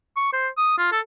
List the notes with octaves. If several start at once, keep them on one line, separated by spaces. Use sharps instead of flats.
C#6
C5
D#6
F4
A4